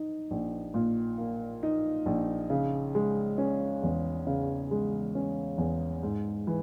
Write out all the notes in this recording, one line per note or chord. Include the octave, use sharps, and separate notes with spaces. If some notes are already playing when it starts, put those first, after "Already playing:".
Already playing: D#4
A#1
A#2
A#3
D#4
A#1
C#3
G#3
C#4
E2
C#3
G#3
C#4
E2
G#2
E3